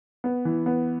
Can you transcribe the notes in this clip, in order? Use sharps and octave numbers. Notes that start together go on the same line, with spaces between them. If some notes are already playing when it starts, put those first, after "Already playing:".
B3
E3
B3